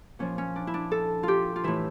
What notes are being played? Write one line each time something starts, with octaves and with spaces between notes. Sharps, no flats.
A#2 F3 C#4
C#4
D4
E4
D4
A4
F4 G4
F4
A2 E3 E4